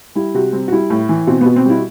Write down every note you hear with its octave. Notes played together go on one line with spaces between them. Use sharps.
G3 E4
C3 F#4
G3 C4
F#4
G3 E4
A2
E3
B2 C4
B2 B3
C4
G3 E4